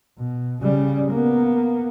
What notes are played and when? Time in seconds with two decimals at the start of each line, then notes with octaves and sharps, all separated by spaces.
0.18 B2
0.61 C#3 G3
1.11 A#3 B3